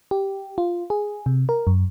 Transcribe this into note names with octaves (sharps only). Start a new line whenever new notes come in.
G4
F4
G#4
C3
A#4
F#2